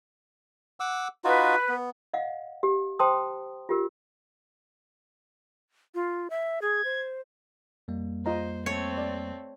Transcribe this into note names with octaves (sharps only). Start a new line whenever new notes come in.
F#5 D6 E6
D#4 F4 F#4 B4
B3
D#5 F5 F#5
G4
C5 G5 A5 C6 D#6
F4 G4 A#4
F4
E5
G#4 G#6
C5
F2 G3 A#3
F4 C5 D#5 A#5
A3 C4 C#5
D5